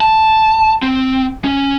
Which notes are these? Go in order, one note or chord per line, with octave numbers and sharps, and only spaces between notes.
A5
C4
C#4